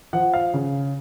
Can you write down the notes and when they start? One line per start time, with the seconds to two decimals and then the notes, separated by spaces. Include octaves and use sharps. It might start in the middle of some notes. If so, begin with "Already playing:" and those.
0.13 F3 F#5
0.34 F5
0.54 C#3